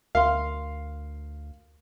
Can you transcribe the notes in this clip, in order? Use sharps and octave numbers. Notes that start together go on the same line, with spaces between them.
D2 A#4 F5 C6